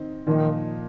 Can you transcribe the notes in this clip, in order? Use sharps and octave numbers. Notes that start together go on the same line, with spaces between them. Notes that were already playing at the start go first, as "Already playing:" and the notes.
Already playing: D#3 C4 D#4 C5
A#2 D#3 F3 D#4